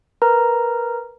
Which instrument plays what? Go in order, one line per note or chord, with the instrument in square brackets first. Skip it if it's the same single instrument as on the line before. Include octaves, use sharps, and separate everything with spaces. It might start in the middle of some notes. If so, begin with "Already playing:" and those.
[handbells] A#4 B4 A#5